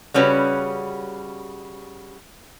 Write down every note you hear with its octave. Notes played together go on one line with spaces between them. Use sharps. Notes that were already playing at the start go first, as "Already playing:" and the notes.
C#3 G3 C#4 F#4 B4